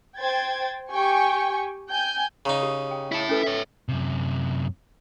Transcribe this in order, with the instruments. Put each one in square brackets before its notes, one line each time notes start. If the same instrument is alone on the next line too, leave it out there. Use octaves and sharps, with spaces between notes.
[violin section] C5 G5 G#6 A6
G4 G5 G#5 C#6
G5 G#5 G6
[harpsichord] C#3 D#4 [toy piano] A#5 C#6
[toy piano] G4
G5
[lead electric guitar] E4 A5
[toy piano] C#4 A4 B4
[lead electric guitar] C#5 E5
F#2 C3